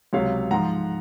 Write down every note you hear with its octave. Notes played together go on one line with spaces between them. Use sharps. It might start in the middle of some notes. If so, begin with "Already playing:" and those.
C#2 C3 F#3 C#5 F5
G#2 F3 F#5 A#5